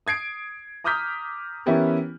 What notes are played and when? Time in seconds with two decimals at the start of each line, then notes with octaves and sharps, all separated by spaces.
0.07 D#6 G#6 C7 D7
0.84 A#5 D6 D#6 F6 G6 B6
1.66 E3 B3 C#4 E4 G4 A#4